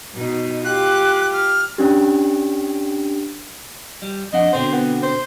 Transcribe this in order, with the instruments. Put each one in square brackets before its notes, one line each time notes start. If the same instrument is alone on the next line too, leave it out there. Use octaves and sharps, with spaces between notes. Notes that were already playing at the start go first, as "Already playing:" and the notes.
[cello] B2 D#4
[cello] F4 G4 [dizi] F#6
[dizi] F6
[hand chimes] C#4 D4 G4
[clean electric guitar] G3
[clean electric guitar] F2 D4 F#5 [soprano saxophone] D#5
[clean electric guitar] B2 D3 C4 [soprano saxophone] C5
[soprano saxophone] B3
C5